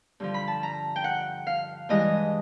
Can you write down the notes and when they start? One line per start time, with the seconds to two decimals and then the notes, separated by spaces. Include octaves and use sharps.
0.20 G2 D3 F3
0.34 B5
0.48 A5
0.63 A#5
0.96 G5
1.04 F#5
1.47 F5
1.89 G2 E3 G#3 D#5